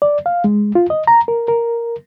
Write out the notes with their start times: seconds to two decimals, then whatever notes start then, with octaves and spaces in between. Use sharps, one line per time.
0.02 D5
0.26 F5
0.44 G#3
0.75 F4
0.90 D#5
1.07 A#5
1.28 A#4
1.48 A#4